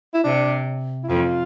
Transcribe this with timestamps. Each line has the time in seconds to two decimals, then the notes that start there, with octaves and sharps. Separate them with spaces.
0.14 E4
0.24 C3 D4
1.04 E4
1.09 F2 F4